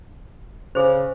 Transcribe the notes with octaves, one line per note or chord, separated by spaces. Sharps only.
C#3 G#4 C5